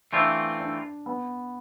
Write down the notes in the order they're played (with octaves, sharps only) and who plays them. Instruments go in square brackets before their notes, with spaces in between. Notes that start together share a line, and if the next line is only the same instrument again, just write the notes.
[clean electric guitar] E3 A3 C4 F4 [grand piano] D4
[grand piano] D4
B3